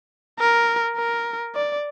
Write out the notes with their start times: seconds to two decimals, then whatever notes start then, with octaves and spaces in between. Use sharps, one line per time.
0.39 A#4
0.96 A#4
1.55 D5